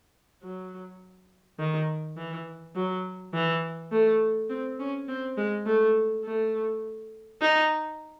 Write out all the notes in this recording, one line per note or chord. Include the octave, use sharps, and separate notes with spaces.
F#3
D#3
E3
F#3
E3
A3
C4
C#4
C4
G#3
A3
A3
D#4